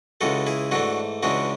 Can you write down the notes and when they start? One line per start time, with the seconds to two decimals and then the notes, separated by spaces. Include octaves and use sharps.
0.21 C#2 C#3 E3 G#3 F#4 A4
0.47 E4 G#4
0.71 G#2 E3 A3 D4 F#4
1.23 C#2 C#3 E3 G#3 D4 F#4